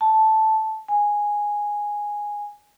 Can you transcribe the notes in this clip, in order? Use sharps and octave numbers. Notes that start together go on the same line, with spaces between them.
A5
G#5